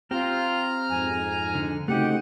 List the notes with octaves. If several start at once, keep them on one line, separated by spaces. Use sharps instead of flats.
C4 F4 G4 A#5 F6
F2 G#2 G#5
D3
C#3 A3 C4 D#4 F#4 G4 F#5